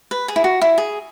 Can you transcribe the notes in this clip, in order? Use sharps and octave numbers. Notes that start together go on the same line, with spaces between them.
B4
G#4
E4
F#4
E4
G#4